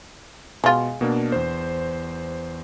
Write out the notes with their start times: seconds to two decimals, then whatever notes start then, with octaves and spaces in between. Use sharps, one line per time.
0.64 B2 G#3 F4
1.01 B2 A#3 D4
1.32 E2 C5